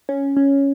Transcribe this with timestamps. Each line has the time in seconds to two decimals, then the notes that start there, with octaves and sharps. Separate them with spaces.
0.09 C#4
0.37 C#4